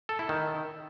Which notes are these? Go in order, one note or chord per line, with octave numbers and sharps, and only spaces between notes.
A4
E4
D#3